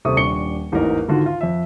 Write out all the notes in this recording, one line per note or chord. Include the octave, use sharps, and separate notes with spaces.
D#1 C3 A4 C#6 D#6
D#1 D4 C#6 C#7 G7
A1 E2 G#2 A#3 D#4 A#4
G#2 D3 D#3 F4 F#4 F5
F4
F2 E5